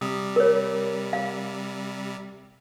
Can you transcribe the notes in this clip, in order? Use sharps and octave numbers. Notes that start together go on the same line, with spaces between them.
C3 G3 D#6
A#4 C#5
F5